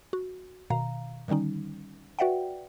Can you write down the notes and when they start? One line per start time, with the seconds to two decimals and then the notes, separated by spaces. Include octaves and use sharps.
0.13 F#4
0.70 B2 D#3 F5 A#5
1.28 D3 D#3 G3 C#4 D#4
2.19 F#4 B4 D5 E5 F#5 G5